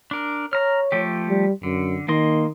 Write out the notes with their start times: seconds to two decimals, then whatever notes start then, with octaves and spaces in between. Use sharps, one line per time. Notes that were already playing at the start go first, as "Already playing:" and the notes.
0.11 D4 A#4
0.53 C#5 A#5 F6
0.92 F3 A3 G4
1.29 G3
1.63 F#2 D3
2.08 D#3 A#3 D#5 C6